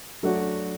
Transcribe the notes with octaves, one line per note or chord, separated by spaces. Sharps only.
F#3 A3 D4 F#4